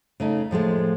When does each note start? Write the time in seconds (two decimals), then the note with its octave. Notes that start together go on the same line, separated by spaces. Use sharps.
0.20 C#3 A3 D#4
0.51 A2 F3 G#3 A3